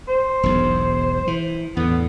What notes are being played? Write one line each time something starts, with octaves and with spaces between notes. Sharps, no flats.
C5
E1 B1 G#2
E3
E2 A2 D3 B3